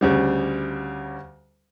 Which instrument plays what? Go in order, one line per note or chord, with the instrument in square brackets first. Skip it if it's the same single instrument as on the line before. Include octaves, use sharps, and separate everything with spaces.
[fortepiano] D2 C#3 G3